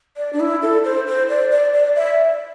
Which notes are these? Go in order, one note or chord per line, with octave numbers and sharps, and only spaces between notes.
D5
D4
E4
A4
C5
C5
D5
D5
D5
E5